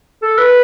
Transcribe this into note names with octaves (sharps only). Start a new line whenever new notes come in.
A4
B4